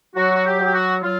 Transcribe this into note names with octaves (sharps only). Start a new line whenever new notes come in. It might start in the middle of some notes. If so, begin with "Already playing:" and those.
F#3 F#4
F#4
G4
F#3
G4
F#4
F#3 F4